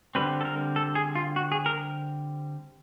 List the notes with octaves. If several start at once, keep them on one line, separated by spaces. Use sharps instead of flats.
D3 G3 C4 B4
A4
A#4
A4
G#4
F4
F#4
G#4
A#4